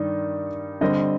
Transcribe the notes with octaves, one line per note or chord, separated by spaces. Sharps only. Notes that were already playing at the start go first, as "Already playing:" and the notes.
Already playing: G2 D#3 G3 D#4
D3 G3 C4 D#5